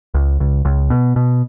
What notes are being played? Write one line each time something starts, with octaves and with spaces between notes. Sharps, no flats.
C#2
C#2
C#2
B2
B2